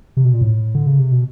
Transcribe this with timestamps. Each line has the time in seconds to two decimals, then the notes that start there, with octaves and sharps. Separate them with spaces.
0.17 C3
0.25 B2
0.34 A#2
0.41 A2
0.75 D3
0.87 C#3
0.99 C3
1.12 B2